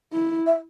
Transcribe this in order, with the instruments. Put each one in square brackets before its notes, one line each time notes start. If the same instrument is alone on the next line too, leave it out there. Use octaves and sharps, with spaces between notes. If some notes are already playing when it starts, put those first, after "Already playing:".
[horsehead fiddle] E4
[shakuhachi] E5